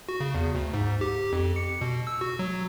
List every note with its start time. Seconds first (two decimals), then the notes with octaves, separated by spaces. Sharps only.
0.09 F#4
0.20 C#3
0.35 E2
0.55 D2
0.74 G#2
1.01 G4
1.33 F2
1.56 C#7
1.81 B2
2.07 E6
2.21 F#4
2.39 F#3